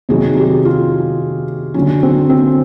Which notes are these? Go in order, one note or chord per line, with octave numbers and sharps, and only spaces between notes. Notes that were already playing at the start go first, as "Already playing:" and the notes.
C3 D#3 F#3 G#4
G4
F4
D3 F#3 C#4
C4
C4